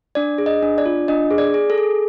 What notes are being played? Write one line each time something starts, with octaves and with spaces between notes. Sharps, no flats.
D4 D5
G#4
D#5
D4
D5
F4
D4 D#5
G#4
D5
G#4
A4
G#4